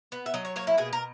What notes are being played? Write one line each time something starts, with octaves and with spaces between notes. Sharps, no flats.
B3
E5
F#3 D#5
C#5
A#3 C#5
E4
B2 G#4
A#4